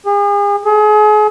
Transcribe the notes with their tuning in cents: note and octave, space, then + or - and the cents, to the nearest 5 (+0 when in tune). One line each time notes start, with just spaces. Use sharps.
G#4 -40
G#4 +35